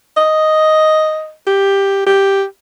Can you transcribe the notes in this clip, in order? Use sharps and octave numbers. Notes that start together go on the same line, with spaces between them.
D#5
G4
G4